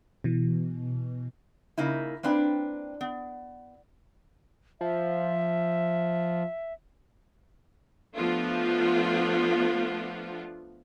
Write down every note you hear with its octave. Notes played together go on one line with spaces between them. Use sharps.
B2 E3
C#3 A#3 D#4 E4
A#3 C4 D4 B4 G5
B3
F3 E5
F3 A3 B3 D4 F4